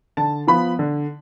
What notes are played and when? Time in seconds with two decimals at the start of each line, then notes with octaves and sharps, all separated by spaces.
0.17 D3 A5
0.47 F3 B3 B5
0.79 D3